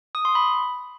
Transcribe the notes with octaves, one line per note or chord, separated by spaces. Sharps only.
D#6
C6
B5